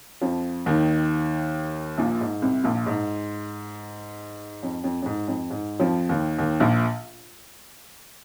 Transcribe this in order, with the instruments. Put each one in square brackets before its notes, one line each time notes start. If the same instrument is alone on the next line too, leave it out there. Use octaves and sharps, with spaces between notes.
[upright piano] F2 F3
D#2 D#3
A#1 A#2
G#2
C2 C3
A#1 A#2
G#2
F2
F2
F2
G#2
F2
G#2
F2 F3
D#2 D#3
D#2 D#3
A#1 A#2